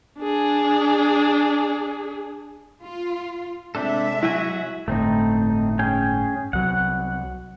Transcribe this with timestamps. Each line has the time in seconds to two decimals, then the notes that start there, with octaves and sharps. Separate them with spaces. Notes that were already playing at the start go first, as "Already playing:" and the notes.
0.20 D4 G#4
2.83 F4
3.75 C3 G#3 C4 D4 A4 E5
4.23 F#3 E4 F#4 G#5
4.88 G1 A2 A3 C4 D#4
5.79 C#4 G#4 G5
6.53 C2 F#3 F#5